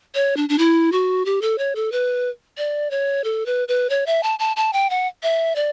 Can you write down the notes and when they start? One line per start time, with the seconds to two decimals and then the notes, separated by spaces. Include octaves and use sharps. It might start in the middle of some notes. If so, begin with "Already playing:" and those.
0.15 C#5
0.37 D4
0.49 D4
0.58 E4
0.92 F#4
1.25 G4
1.42 A4
1.58 C#5
1.75 A4
1.92 B4
2.58 D5
2.91 C#5
3.24 A4
3.46 B4
3.68 B4
3.90 C#5
4.06 E5
4.23 A5
4.39 A5
4.56 A5
4.73 G5
4.90 F#5
5.23 E5
5.56 D5